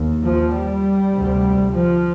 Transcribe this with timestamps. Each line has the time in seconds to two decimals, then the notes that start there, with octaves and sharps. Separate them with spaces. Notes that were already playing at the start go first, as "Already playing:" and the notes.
Already playing: D#2
0.22 F3
0.52 G3
1.12 D2 C3
1.72 F3